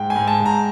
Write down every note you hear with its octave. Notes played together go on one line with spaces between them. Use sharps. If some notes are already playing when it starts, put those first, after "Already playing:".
Already playing: G#2 G5
G#5
G#2
A5
G#2
A#5